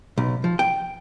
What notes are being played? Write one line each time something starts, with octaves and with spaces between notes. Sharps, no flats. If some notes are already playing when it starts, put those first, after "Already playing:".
B1
F3
G5